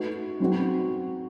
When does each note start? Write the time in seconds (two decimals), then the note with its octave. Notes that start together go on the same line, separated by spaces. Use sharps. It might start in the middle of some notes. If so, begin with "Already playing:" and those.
Already playing: A3 D#4 F#4 B4
0.40 F#3 C4 D#4 F#4